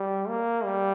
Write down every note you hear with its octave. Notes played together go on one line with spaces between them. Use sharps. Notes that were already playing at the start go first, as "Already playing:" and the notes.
Already playing: G3
A#3
G3